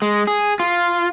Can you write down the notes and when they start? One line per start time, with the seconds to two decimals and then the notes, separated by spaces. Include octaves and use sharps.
0.02 G#3
0.27 G#4
0.60 F4